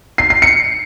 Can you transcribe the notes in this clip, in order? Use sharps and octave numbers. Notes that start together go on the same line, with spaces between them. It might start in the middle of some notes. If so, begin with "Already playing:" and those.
C7
C7
C#7